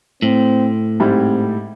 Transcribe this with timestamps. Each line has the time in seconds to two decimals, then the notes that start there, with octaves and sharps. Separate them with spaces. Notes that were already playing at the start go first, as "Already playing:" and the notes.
0.22 A2 C4
1.00 G#2 G3 C4 E4